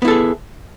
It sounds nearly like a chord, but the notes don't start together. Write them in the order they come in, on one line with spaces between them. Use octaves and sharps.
B3 E4 A4 G#4